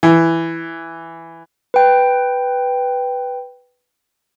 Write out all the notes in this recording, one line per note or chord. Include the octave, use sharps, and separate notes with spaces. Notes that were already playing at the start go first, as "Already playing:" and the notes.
E3
B4 G5